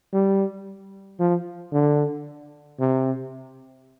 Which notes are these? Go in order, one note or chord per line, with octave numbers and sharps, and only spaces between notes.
G3
F3
D3
C3